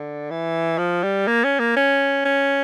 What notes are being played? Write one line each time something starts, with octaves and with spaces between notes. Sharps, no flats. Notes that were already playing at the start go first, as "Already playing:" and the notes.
Already playing: D3
E3
F3
G3
A#3
C#4
A#3
C#4
C#4